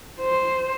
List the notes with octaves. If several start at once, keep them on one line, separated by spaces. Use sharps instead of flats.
C5